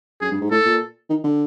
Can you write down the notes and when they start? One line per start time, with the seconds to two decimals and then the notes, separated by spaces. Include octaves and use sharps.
0.21 F#2 G#4
0.31 G2
0.41 G#2
0.51 A2 A4
0.65 A#2
1.09 D#3
1.24 D3